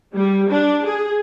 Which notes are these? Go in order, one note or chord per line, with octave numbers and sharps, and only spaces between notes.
G3
D4
G#4